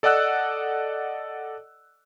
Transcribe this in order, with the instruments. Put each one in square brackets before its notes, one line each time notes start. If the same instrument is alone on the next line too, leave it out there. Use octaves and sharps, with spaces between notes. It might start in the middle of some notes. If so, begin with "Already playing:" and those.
[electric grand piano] A4 D5 D#5 F#5 E6 F#6